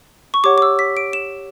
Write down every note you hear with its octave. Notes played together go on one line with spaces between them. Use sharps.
C#6
G4 C#5 F#5 D6
D6
E6
B6
D7
E7